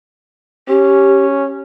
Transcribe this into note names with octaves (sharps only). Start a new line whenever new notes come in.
C#4 G4